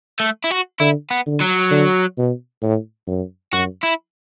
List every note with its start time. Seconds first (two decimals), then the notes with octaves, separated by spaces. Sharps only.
0.20 A3
0.44 E4
0.51 F#4
0.80 D3 E4
1.11 B3
1.26 D3
1.41 F#3
1.71 D3
2.17 B2
2.62 A2
3.07 F#2
3.53 F#2 F#4
3.83 E4